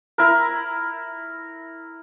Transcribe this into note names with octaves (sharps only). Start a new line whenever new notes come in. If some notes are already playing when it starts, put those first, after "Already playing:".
E4 A#4